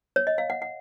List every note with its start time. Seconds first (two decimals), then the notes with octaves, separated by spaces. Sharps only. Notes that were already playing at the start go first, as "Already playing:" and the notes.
0.16 C#5
0.27 D#5
0.38 F5
0.50 F#5
0.62 F#5